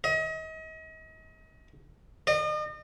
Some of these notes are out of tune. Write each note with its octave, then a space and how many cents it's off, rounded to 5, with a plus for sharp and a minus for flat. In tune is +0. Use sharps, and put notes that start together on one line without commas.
D#5 +35
D#5 -40